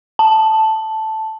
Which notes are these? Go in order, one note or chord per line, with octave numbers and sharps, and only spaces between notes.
A5